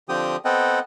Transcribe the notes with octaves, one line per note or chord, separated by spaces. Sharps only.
D3 F3 C4 G4 G5 D#6
B3 C4 A4 D#5 F#5 G5